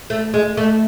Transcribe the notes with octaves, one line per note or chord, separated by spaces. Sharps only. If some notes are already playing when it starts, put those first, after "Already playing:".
A3
G#3
A3